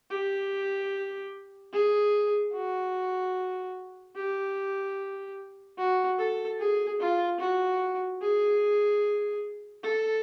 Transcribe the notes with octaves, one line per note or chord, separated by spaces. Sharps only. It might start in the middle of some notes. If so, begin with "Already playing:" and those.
G4
G#4
F#4
G4
F#4
A4
G#4
F4
F#4
G#4
A4